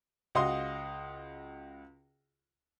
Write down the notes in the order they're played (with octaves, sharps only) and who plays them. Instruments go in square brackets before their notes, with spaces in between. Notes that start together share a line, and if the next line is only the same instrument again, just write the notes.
[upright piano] C#2 F#4 D#5 F5 C6 D#6